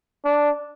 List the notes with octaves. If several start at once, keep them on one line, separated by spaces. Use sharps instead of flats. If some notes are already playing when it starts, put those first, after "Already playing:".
D4